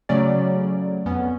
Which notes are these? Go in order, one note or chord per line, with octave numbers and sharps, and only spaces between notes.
C#3 F#3 A3 C#4 D5
F2 B3 C#4